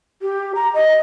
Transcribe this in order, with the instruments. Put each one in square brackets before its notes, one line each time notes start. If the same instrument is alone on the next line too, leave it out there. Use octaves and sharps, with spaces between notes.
[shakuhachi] G4
A#5
D#5